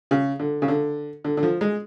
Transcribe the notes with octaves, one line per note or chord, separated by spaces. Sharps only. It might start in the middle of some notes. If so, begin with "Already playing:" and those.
C#3
D3
C#3
D3
D3
D3
F3
G#3